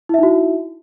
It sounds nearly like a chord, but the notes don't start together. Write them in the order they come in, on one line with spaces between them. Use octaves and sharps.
E4 E5 D#4 F#4